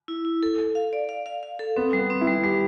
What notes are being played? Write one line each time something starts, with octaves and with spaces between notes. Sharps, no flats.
E4
E4
A4
A4
F5
D5
F5
F5
F5
A4
B3 C4
G3
B3
C4
E4
G3
G3 G4